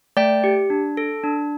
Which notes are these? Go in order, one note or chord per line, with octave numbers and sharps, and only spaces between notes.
A3 D5 G5
G4
D4
A4
D4